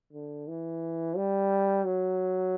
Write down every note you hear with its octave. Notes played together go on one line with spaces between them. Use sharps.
D3
E3
G3
F#3